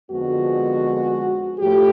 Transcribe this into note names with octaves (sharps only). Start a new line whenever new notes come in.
F2 D3 F3 G#3 B3 F#4
A2 F3 A3 G4